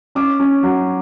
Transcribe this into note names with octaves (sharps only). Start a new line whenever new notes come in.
C#4 D6
C#4
F#3